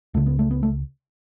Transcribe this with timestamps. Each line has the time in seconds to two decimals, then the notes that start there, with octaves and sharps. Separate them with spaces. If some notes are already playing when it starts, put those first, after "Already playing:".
0.14 C#2 C#3 A3
0.26 B3
0.39 A3
0.51 B3
0.63 A3